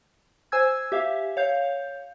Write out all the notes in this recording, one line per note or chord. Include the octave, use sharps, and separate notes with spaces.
C5 G#5 E6 G#6
G4 E5 F5
C#5 F5 G6